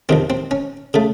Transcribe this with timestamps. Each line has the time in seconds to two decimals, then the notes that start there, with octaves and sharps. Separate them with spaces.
0.09 F2 C3 D#3 C4
0.30 C4
0.51 C#4
0.94 C#3 A3